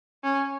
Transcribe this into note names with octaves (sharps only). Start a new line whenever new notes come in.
C#4